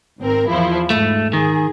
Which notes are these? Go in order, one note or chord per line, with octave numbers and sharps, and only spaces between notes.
G#1 C4 A#4
E2 F3 E4
G#2 A3
D#3 G#4